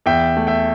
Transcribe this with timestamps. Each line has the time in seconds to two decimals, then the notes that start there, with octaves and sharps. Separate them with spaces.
0.06 E2 E5 G5
0.37 A3
0.47 E5 G5